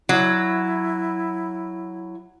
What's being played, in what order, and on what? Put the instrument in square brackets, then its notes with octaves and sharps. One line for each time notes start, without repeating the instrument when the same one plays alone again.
[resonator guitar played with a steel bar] F#3 [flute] E4